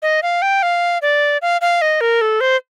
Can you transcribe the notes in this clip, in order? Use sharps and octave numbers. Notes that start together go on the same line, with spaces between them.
D#5
F5
G5
F5
D5
F5
F5
D#5
A#4
A4
C5